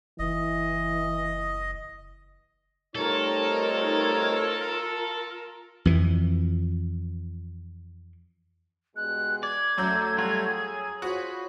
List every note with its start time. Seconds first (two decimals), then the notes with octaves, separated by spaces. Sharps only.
0.19 F#1 E3 D#5
2.96 G3 A3 C4 D#4 F4 A4 A#4 C#5
5.85 F2 E3
8.96 G2 B2 G#3 F#6
9.43 D5 G#6
9.78 F#2 F#3 A3 G6
10.18 G3 F4 F#4
10.48 G#4
11.02 F4 F#4 C5 C#5 B5